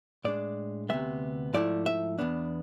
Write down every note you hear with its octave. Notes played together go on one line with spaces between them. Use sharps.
A2 G#3 D4 D5
D2 C3 F3 G#3 B3 E5
G#2 F3 A3 E4 D5
E5
E2 B2 B3 D4